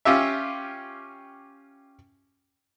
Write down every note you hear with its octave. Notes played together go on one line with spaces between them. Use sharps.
C#4 F4 G4 E5